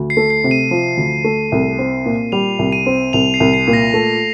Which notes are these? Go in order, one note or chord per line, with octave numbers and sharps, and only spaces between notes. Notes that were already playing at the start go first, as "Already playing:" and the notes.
Already playing: D2
C7
A3
C7
C3
D#7
F3
D2
A3
C2
C4
A#2
G3 F7
C2
D#7
C4
C2 F7
C7
C2
C7
A#2
A#6
A3